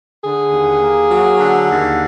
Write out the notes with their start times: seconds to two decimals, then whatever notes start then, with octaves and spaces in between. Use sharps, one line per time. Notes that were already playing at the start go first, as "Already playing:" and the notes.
0.23 D3 G#4
0.52 D#2
0.81 A#3
1.11 F#3
1.40 D3
1.69 D#2